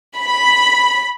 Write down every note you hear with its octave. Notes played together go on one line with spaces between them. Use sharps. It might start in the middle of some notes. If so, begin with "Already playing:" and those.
B5